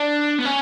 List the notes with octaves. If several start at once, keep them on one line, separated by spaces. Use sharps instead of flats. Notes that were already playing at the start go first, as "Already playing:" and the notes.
Already playing: D4
B3
C#4